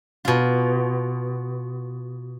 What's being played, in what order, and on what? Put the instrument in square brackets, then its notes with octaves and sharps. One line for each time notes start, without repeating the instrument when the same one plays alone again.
[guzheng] B2 F4